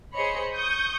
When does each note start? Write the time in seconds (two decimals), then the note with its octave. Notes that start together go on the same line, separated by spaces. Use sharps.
0.14 G#4 C5 C#5 D#5 B5 C#7
0.55 C#6 D#6 G6